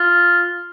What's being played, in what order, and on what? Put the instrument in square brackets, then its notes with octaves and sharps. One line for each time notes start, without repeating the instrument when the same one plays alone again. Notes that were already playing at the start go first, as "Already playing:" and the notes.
Already playing: [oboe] F4